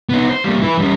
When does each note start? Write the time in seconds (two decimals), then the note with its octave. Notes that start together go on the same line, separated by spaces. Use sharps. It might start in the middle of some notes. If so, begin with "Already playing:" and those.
0.09 B3 D#4
0.30 C5
0.44 G3 A#3
0.62 E4 B4
0.78 G3 C#4